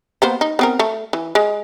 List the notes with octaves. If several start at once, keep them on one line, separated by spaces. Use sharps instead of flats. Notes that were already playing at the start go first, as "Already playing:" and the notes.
A#3 B3 C5
D#4
B3 C4 A#4
A3
E3
G#3